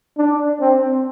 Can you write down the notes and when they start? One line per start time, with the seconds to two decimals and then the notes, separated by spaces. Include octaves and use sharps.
0.18 D4
0.61 C4